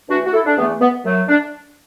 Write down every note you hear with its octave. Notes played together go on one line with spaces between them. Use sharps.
E2 E3 A3 D4 F#4
F#4
E4 A4
D4
E2 E3 A3 B3
B3
F#2 F#3 A3
D4